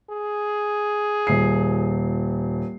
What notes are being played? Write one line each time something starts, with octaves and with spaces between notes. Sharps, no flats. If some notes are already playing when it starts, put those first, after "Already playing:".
G#4
D#1 C7